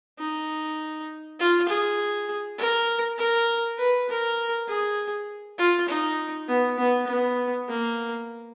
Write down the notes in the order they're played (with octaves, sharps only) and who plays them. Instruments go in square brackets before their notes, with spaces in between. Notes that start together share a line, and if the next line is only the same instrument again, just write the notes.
[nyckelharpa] D#4
F4
G#4
A#4
A#4
B4
A#4
G#4
F4
D#4
B3
B3
B3
A#3